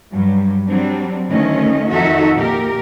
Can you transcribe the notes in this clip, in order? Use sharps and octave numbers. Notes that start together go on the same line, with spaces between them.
G2 F#3 G3
F#3 G3 C4 D4
D2 D#3 A3 C#4 D#5
F2 D#3 D#4 F#4 A4 E5
A#2 G4 A#4